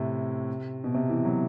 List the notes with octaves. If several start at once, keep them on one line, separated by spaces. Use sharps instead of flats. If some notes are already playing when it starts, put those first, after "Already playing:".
Already playing: A2 C3
B2
C3
E3
F#3